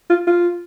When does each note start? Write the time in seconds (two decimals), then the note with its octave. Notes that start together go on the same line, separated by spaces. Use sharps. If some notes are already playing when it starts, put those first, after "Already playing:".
0.10 F4
0.27 F4